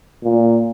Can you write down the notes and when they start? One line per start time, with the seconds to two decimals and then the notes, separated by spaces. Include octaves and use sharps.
0.24 A#2